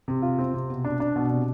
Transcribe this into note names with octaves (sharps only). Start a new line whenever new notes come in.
C3
F4
C4
C3
B2
D4
D4
B2
C3